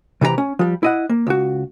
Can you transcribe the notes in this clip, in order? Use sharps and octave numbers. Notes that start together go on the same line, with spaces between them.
C3 E3 G4 D5 A#5
C#4
F3 G3
E4 D#5 F#5
A#3
C#2 F#4